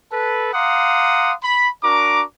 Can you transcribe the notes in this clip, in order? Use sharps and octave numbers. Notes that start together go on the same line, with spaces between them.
A4 B4 A5
F5 F#5 A#5 C6 D6 D#6
B5
D4 F#4 A#4 A#5 D6